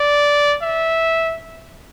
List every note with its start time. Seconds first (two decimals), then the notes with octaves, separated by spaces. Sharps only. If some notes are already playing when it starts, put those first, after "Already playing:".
Already playing: D5
0.63 E5